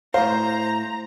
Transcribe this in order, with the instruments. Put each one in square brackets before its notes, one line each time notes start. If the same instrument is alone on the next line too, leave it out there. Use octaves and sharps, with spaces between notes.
[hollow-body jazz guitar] A2 F5 [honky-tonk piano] C5 [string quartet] A#5